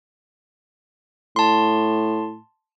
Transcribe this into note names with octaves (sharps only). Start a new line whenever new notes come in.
A2 A5 C6